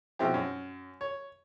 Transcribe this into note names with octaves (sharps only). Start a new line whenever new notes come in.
B2 F3 G#3 C4 E4 G4
F#2
C#5